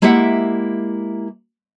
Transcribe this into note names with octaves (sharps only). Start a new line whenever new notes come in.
G#3 A#3 E4 G4 E5 F#5